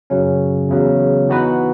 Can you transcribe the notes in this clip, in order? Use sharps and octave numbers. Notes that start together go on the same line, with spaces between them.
F#2 C#3 F#3 C#4
E2 C#3 F#3
E3 B3 D#4 F#4 B4